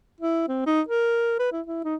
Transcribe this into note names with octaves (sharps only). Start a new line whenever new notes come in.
E4
C4
D#4
A#4
B4
E4
E4
D#4